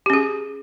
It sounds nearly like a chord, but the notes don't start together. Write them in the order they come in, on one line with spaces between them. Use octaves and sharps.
G4 C#4 G#4